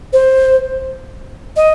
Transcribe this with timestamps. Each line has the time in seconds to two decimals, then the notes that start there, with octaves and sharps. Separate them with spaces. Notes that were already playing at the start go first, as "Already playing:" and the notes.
0.13 C5
1.56 D#5